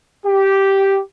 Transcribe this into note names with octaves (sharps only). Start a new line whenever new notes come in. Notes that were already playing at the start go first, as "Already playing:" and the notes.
G4